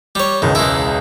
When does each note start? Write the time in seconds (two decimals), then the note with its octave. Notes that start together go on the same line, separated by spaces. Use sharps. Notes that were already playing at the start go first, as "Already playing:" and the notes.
0.15 G3 C#5
0.42 E1 C#2 D#3 E3
0.55 G#3 E4